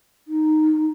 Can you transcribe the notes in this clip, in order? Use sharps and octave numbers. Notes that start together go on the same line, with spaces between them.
D#4